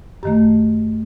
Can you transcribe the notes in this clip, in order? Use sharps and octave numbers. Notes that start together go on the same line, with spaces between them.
F#2 D#3 A3 G4